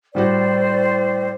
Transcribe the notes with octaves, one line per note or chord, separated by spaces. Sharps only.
A2 G3 F#4 C5 D5